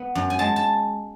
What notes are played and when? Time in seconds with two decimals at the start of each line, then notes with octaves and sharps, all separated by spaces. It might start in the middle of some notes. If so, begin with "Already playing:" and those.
Already playing: B3
0.15 F#2
0.30 G#5
0.39 G#3 A5
0.56 A5